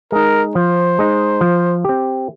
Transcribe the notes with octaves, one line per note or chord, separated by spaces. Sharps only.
G#3 D#4 A#4
F3 C5
G#3 D#4
F3
C4 G4